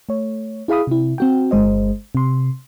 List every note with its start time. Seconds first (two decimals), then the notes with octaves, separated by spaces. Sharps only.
0.09 A3 C#5
0.68 E4 G#4 F5 B5 D#6
0.87 C3 E4
1.18 C4 F#4 G5
1.51 G1 G#3 C5 D#5
2.15 C3 C6